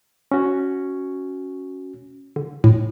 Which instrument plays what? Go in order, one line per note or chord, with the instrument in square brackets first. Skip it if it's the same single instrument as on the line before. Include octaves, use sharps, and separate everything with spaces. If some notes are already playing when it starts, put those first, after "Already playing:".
[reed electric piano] C#4 F#4
[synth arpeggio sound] D3
A2